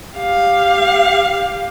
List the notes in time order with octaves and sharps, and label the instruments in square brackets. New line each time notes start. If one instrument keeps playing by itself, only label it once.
[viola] G4 F5